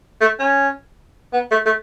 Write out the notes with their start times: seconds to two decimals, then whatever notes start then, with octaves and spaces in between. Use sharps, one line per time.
0.21 A3
0.39 C#4
1.33 B3
1.51 A3
1.66 A3